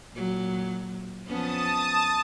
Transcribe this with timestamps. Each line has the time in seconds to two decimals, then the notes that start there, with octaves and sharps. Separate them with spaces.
0.12 A#2 F#3
1.27 F2 B3 C#4 A5 D#6